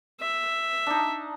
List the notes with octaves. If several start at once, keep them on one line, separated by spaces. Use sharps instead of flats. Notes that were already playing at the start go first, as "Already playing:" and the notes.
E5
D4 D#4